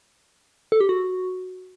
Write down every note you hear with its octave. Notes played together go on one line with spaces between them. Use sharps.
A4
G4
F#4